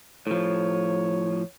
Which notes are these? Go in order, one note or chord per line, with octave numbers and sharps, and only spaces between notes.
A2 F3 C#5